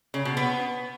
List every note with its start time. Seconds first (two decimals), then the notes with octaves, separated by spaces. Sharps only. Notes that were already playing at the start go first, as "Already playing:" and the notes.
0.14 C#3
0.25 B2
0.37 B3